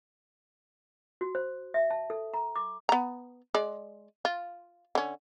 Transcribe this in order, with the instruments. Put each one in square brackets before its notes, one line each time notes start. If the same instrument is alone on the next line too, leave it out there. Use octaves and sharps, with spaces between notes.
[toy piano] F#4
C5
E5
A5
A4
A#5
D6
[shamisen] B3 A#5
G#3 D5
F4
D3 C#4